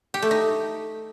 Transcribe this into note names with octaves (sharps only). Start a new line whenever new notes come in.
G4
A3
D#4